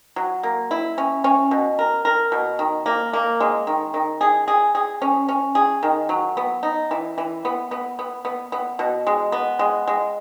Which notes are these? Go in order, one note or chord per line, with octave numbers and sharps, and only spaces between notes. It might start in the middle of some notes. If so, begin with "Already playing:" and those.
F#3
A#3
E4
C#4
C#4
B2
A#4
A#4
B2
D#3
A#3
A#3
G#3
D#3
D#3
G#4
G#4
G#4
C#4
C#4
G#4
D#3
F#3
B3
D#4
E3
E3
B3
B3
B3
B3
B3
B2
G#3
B3
G#3
G#3